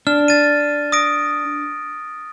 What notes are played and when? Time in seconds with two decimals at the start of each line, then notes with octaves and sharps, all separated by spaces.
0.07 D4 F6
0.28 A6 D#7
0.92 D#6 A#6 D7